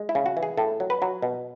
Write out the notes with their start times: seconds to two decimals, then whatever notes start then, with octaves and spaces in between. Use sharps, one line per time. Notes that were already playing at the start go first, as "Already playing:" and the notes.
Already playing: G#3
0.09 E4
0.15 C#3
0.26 F#4
0.37 E3
0.43 G#4
0.58 A2 A4
0.80 F#3
0.90 B4
1.02 F#3
1.22 B2